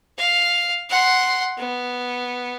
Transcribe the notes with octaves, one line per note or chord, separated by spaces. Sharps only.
F5
F#5 C6
B3